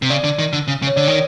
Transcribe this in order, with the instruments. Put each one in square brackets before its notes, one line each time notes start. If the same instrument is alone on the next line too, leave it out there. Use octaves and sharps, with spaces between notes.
[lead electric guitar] C3
[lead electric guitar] C#3 [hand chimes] D5
[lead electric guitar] D3
D#3
D3
C#3
C#3
[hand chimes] C#5
[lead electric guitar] D3 [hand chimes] D5
[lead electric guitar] D#3